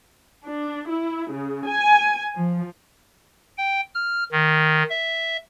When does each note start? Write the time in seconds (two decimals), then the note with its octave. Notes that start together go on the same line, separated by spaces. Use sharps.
0.45 D4
0.91 E4
1.33 C#3
1.69 G#5
2.35 F3
3.58 G5
3.95 F6
4.32 D#3
4.89 E5